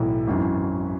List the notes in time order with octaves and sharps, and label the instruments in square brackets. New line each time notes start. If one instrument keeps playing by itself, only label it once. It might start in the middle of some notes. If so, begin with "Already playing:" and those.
Already playing: [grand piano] B1 A2 E3
G#1 F#2 E3